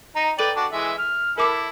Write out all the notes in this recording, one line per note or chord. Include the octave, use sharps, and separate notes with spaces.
D#4 A#5
A4 B4 D5 G5 D#7 F#7
D4 F#4 D6
E3 G#3 E5
F6
E4 A4 A#4 D6 B6